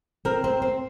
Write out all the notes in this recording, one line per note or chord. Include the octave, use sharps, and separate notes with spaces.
C4 A#4
C4
C4